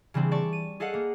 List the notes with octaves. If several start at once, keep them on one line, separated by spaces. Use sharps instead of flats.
C#3 E3 G3 C4 D4
D5 A5 C#6 D7
D#7
G#4 A4 D#5 F5 F#5
A#3